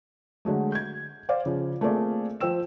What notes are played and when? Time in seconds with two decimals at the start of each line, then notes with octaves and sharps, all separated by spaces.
0.45 D3 F#3 G#3 A3
0.72 G6 G#6
1.29 C5 D5 F5
1.46 C#3 F3
1.81 A3 A#3 C4 F4 G#4 D5
2.40 F3 C5 G5 E6 E7